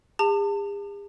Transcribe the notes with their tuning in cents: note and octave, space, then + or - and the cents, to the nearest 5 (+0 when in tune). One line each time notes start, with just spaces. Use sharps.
G#4 -45 A5 +30